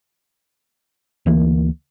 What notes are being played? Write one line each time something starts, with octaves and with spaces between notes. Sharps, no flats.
D2 E3 A#3